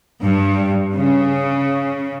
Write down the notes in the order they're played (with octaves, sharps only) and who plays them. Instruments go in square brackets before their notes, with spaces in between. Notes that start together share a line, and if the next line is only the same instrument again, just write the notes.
[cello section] G2
C#3